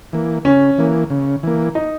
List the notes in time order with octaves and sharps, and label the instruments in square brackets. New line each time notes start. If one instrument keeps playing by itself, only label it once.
[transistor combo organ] E3 A#3
[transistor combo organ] C#3 [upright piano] C#4
[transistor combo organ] E3 A#3
C#3
E3 A#3
[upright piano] D#4